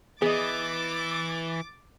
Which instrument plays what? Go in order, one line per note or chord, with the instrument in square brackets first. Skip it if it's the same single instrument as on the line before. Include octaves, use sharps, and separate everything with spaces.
[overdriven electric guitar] E3 [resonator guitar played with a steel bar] B3 D#5 [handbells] G#4 [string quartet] D6 A6